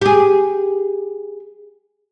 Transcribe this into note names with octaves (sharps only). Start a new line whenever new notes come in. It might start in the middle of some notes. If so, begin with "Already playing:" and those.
G4 G#4